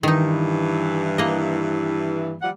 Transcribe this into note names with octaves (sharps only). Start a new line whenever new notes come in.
G2 D#3 E3 D#4
A#3 D#5
F3 G3 F#5